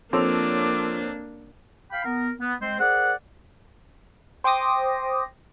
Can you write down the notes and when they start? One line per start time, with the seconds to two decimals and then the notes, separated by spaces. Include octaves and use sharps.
0.13 F3 A#3 C4 D4 A4 C#5 D6 F7
1.92 F5 G5 B5
2.05 B3 A#4
2.39 B3
2.60 G#3 C4 C5
2.80 G#4 A#4 C5 D5 F#5
4.44 C5 G5 C6 D6 D#6 A#6